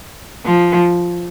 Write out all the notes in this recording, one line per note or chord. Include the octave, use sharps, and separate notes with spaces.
F3